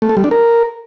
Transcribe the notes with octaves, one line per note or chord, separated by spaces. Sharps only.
A3
A4
G3
D4
A#4